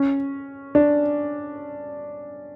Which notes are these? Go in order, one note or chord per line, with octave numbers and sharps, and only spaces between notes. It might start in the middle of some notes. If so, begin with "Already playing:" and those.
Already playing: C#4
D4